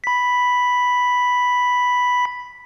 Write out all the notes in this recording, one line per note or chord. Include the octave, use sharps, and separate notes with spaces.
B5 B6